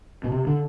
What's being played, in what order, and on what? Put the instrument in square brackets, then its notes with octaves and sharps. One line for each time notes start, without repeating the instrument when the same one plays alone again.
[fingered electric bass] B2
C3
D3